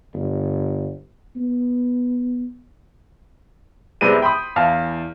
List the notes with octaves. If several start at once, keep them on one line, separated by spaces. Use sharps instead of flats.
G1
B3
C2 C3 G3 G#3 B3 D#7
G5 B5 C6 D#6
E2 E3 F5 A5 F6